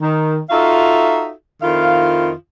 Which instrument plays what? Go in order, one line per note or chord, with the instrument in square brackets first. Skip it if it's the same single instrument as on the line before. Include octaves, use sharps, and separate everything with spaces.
[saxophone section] D#3
D#4 F4 F#4 A4 E5 F5
F2 D#3 E4 F4 F5